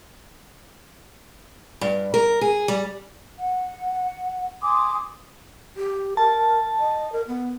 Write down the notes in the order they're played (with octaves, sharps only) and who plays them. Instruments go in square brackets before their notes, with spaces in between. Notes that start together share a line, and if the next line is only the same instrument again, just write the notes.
[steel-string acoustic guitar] G2
A#4
G#4
G3
[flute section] F#5
G#5 C6 D6 D#6
[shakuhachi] G4
[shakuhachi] A#4 [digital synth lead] A5
[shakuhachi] D#5
A#4
B3